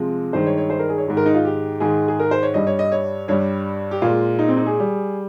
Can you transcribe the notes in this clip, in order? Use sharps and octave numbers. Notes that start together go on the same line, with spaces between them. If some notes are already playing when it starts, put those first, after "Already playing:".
Already playing: C3 F3 G#3
G2 D#3 G#3 C5
C#5
C#5
C5
A#4
G#4
C#5
G#2 D#3 G#3
A#4
D#4
F4
G4
G#2 D#3 G#3 G#4
G#4
A#4
C5
C#5
G2 G3 D#5
C#5
D#5
C#5
G2 G3 C#5
G4
A#2 G#3 F4
D#4
C4
D#4
G#4
G3